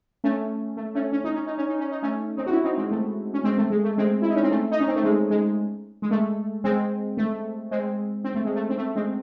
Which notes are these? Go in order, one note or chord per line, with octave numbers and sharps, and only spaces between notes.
A3 C#4
A3
A3 C#4
C#4
D#4
C#4
D#4
C#4
D#4
C#4
D#4
A3 C#4
C4 D#4
F#4
C#4 E4
C4 D#4
G#3 C4
A3
C#4
G#3 C4
A3
G#3
A3
G#3 C4
E4
D#4
C#4
C4
A3
D#4
C#4
C4
A3
G#3
G#3
G#3
A3
G#3 C4
A3
G#3 C4
C4
A3
G#3
A3
C4
A3
G#3 C4